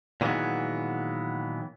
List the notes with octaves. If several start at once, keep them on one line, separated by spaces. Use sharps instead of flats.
A#2 D#3 E3 F#3 G#3 B3